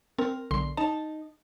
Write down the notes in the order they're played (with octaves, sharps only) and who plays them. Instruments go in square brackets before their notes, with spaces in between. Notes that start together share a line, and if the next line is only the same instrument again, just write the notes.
[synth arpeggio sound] C4 [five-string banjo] A#4
[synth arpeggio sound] B1 D3 C6
[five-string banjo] D#4 [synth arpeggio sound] A5